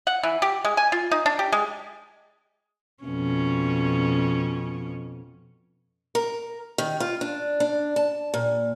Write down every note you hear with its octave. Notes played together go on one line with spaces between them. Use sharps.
F#5
E3
G4
G#3
G#5
F4
D#4
D4
G4
G#3
F2 B2 C#4
A#4
D#3
F4
D4
D4
A5
A#2